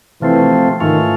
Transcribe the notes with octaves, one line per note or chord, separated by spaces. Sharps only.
C3 E3 F3 A3 C4
G#2 D#3 E3 A3 C#4 F4